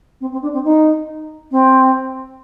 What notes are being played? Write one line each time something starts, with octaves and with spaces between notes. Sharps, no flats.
C4
C4
D4
C4
D#4
C4